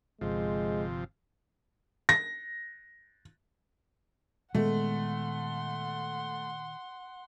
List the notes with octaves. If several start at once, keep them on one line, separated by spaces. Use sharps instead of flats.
G1 C3 F3 G#3
A#6
A#2 D#3 G#3 A3 B3 F#5 C6